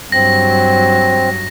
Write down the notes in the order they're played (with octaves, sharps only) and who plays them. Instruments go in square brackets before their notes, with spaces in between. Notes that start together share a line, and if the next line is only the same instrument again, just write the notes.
[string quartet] G2 F#3 [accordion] C4 [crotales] A#6